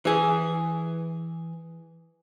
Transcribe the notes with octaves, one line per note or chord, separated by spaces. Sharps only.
E3 G#4